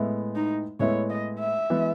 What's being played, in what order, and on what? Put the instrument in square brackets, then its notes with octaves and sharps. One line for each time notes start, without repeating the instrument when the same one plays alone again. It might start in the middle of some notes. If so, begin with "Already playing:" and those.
Already playing: [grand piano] A2 G#3 B3 E4
[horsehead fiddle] D#4
[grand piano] A2 G#3 B3 E4 [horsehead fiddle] C#5
[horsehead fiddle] D#5
E5
[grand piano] E3 G#3 B3